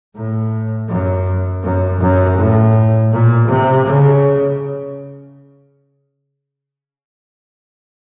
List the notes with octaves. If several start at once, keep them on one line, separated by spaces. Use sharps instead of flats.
A2
F#2
F#2
F#2
A2
A#2
C3
C#3